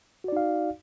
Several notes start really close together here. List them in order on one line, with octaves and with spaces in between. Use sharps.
F#4 D5 D#4 F5